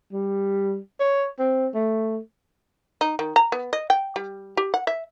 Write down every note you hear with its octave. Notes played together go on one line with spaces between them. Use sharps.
G3
C#5
C4
A3
D#4
D#3
A#5
B3
D#5
G5
G3
G4
F#5
E5